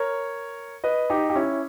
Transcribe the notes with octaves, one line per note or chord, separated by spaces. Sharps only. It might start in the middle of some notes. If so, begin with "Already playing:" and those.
Already playing: A#4 C#5
B4 D#5
D#4 G4
G4
C#4 E4